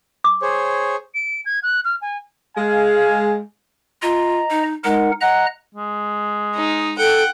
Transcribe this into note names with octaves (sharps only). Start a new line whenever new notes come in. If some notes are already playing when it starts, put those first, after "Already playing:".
D6
G#4 C5 C#5
D7
G#6
F#6
F6
G#5
G#3 F5 G#5
F4 D#5 A#5
D#4
G#3 D#4 A#4 F#5
D#5 F#5 A#5 F#6
G#3
D#4
A4 F#5 G5